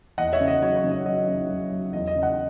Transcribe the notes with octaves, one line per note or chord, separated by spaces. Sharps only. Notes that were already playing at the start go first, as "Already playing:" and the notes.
E2 D#5 F#5
C#5 E5
C#3
D#5
F#3 C#5
C#5
C#3
D#5
F#3 D#5
C#3
F#3
F#3
E2 D#5
D#5
C#3
D#5 F#5